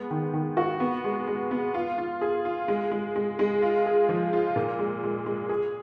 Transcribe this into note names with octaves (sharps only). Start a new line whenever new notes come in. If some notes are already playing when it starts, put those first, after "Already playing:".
Already playing: G#3 B3
D#3
D#3
F#4
B3
G#3
G#3
B3
F4
F4
G#4
F4
G#3
G#3
G#3
G#3
F4
G#4
F3
F4
A#2
G#3
G#3
G#3
G#4